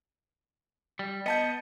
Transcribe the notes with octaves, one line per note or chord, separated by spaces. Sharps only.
G3
B3 D#5 A5 G6